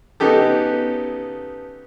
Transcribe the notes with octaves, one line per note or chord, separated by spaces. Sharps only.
C#3 B3 D#4 G4 A4